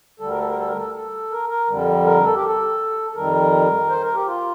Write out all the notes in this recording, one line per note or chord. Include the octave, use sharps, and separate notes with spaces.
D2 D3 G3 A4
A#4
A4
A#4
A4
A#4
A4
A4
A#4
A#4
F2 D3 G3
A#4
A4
G4
A4
A4
F2 D#3 G3 A#4
C5
A#4
G4
F4